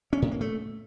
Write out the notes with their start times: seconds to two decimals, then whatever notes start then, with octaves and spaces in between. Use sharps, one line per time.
0.13 C#4
0.22 A2
0.31 A#3
0.41 A3